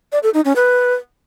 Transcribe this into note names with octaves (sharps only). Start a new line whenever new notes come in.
D5
A4
D#4
C#4
B4